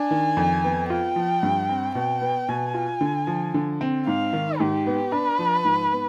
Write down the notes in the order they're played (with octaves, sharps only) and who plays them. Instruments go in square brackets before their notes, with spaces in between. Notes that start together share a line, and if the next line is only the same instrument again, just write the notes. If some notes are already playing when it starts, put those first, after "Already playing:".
Already playing: [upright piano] D4 [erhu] G#5
[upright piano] D#3
F2
B3
[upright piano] F4 [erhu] G5
[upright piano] F3
G2
C4
[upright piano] B2 [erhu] G5
[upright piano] B3
[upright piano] B2 [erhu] G#5
[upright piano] F4
D3
F3
D3
C4
[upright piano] G#2 [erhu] F5
[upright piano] D#3
[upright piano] G#2 [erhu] G4
[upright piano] B3
[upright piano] D4 [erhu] B4
[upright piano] F3
G#2
B3